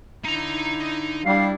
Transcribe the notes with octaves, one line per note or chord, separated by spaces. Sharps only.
D3 D#4 E4 A#5
G3 D4 E4 F5